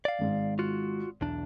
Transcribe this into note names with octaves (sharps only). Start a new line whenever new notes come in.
D5 F5
G#1 G#2
F4 F#4
B1 E2 D4